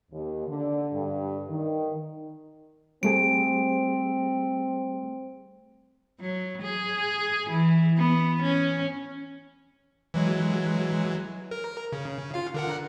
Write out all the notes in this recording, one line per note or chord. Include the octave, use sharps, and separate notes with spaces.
D#2
D3
G2
D#3
G3 A3 C4 G#4 D7
F#3
G#4
E3
B3
C#4
E3 F#3 G#3
A#4
C#3
F4 F5
D3 A#4 F#5